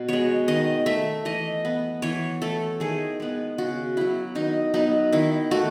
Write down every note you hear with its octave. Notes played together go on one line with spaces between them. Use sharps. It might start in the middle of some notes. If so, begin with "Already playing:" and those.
Already playing: B2
G#3 B3 C#5
D#3 D#5
A3 E5
E3 D#5
B3
E3 C#5
A3 A4
D#3 G#4
G#3 B3
C#3 F#4
F#3 B3 E4
D#3 D#4
F#3 B3 D#4
D#3 E4
A3 F#4